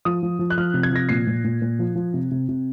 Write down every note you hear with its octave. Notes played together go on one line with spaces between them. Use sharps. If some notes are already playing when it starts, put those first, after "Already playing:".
F3 D#6
F3
F3
F#6
F3 F6
C3
G#6
F3 A#6
A#2 C7
A#2
A#2
A#2
F3
F3
C3
C3
C3